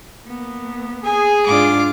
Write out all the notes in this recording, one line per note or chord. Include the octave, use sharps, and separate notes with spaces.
A#3 B3
G#4 G#5
G#2 D4 F4 D6